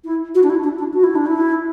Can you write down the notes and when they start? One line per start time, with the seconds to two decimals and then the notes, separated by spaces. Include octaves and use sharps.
0.05 E4
0.35 F#4
0.43 D4
0.50 E4
0.64 D4
0.79 D4
0.94 F#4
1.04 E4
1.15 D4
1.26 E4